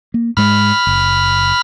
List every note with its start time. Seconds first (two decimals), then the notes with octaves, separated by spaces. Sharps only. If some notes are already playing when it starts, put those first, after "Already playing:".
0.14 A#3
0.37 G#2 G#3 B5 F6
0.87 F#1